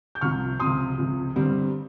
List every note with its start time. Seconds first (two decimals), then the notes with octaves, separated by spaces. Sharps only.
0.15 G6
0.21 C2 C3 F3 C#6 F6
0.60 C#2 C3 F3 C6 D#6
0.98 C#2 C3 F3
1.36 G1 G2 G3 C4